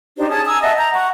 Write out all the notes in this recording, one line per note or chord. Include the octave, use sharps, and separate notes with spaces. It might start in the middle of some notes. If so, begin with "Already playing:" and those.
D4 D#4 G4 C5
C#4 G#4 A5 D#6
G#5 A#5 D#6 E6
D#5 E5 F#5 A5
A#5 G6
F#5 C#6